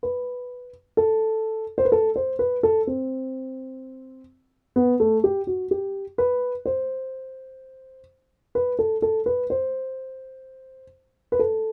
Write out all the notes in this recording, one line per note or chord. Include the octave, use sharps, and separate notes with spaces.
B4
A4
C5
B4
A4
C5
B4
A4
C4
B3
A3
G4
F#4
G4
B4
C5
B4
A4
A4
B4
C5
B4
A4